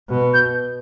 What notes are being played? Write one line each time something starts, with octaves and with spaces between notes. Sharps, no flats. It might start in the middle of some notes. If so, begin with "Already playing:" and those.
B2
G6